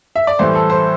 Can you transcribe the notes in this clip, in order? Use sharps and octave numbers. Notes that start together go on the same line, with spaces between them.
E5
D5
A2 E3 G3 C5
A4
C5